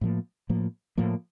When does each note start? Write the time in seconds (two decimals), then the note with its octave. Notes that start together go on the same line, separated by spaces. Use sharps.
0.01 A2 F3 A#3
0.49 A2 F3 A#3
0.98 A2 F3 A#3